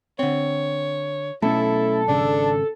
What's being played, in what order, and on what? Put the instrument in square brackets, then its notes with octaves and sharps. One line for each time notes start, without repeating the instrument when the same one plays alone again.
[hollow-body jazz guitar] D3 C4 [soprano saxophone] C#5
[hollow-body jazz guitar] B1 [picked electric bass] A3 C#4 [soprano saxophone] E4 [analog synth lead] A4
[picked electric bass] G#1 C#3 [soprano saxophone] D4